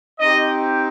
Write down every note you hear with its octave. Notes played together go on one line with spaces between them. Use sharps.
C4 D#4 G4 D#5